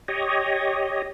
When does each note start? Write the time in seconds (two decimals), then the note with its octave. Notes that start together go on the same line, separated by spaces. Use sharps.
0.08 G4 C#5 D#5